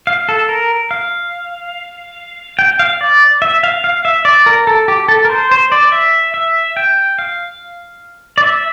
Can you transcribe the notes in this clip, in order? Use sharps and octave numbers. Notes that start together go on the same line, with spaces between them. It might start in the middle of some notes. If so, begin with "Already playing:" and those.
F5
A4
A#4
F5
G5
F5
D5
E5
F5
F5
E5
D5
A#4
A4
G4
A4
A#4
C5
C5
D5
E5
E5
G5
F5
D5
E5